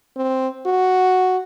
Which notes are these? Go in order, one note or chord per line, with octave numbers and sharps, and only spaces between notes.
C4
F#4